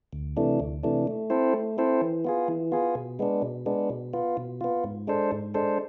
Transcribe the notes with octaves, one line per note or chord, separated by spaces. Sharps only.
D2
C3 E3 A3 D4
D2
C3 E3 A3 D4
A3
C4 E4 A4 C5
A3
C4 E4 A4 C5
E3
B3 F4 G#4
E3
B3 F4 G#4
B2
G#3 B3 D4
B2
G#3 B3 D4
B2
B3 F4
B2
B3 F4
G#2
G#3 D4 A4 C5
G#2
G#3 D4 A4 C5